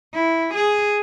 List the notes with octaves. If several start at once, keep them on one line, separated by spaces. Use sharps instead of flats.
E4
G#4